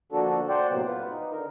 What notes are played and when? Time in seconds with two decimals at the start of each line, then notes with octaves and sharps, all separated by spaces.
0.12 D3 F3 A#3 D4 F#4 A4
0.49 C5 D5 F#5 G5
0.69 A2 C3 F#3 A#3 B3
0.87 F4 B4
1.09 D#4
1.32 D3 A#4